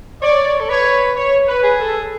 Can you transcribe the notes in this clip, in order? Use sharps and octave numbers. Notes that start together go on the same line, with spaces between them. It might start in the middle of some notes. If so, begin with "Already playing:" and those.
C#5 D5
A4
B4 C#5
C#5
B4
G#4
A4